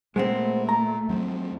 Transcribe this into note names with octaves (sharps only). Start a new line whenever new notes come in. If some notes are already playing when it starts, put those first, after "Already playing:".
A#2 G#3 A3 B3 C4
A#5
F2 F#3 C4